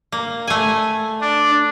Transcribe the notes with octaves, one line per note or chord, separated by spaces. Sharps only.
A#3
A3 G#5
D4